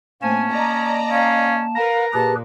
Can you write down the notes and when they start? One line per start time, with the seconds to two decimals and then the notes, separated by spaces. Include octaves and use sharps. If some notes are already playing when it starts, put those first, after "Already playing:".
0.22 A2 A#3 C4 C#4 G#5 A5
0.52 D5 D#5 A#5
1.10 C#4 F5
1.75 A#4 B4 F5 A#5
2.13 A#2 G4 G#4 B4 A5